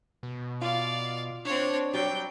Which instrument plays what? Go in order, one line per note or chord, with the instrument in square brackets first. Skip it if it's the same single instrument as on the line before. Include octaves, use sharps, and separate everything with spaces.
[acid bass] B2
[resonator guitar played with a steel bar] F4 [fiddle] D5 F5
[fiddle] C4 C#5 [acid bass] D4
[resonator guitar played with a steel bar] F#3 G3 [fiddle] G5